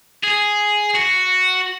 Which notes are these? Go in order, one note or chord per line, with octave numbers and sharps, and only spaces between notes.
G#4
F#4